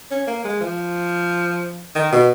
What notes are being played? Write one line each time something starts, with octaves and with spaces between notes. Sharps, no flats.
C#4
A#3
G#3
F3
D#3
B2